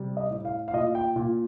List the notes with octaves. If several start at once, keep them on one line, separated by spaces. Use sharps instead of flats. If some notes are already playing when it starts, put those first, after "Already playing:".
Already playing: C3 G3
D#5
A2
F5
F5
A#2 D#5
G5
A#2